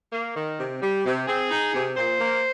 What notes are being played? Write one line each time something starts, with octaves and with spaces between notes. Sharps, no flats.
A#3
D#3
C3
G3
C3
C4 G#4
D#4
C3
A#2 C5
A#3